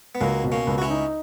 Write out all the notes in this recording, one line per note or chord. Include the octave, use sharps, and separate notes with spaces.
B3
C#2 F#3 A#3
B2
A#3 C#4
C#2
F#4
C#4 E4
D#4